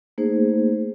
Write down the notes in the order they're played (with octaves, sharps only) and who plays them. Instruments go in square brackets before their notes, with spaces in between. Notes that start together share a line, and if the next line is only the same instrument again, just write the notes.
[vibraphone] A3 A#3 D#4 G#4 C5